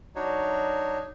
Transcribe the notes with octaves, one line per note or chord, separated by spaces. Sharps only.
F#3 D4 D#4 F#4 C#5